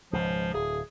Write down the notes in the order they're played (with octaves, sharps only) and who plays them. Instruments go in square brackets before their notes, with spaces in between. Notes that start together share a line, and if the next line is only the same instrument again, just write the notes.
[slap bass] C#2 G#2 B2 [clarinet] F3
[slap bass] D1 [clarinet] G#4